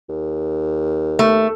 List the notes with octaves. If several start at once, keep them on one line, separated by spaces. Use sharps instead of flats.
D#2
A3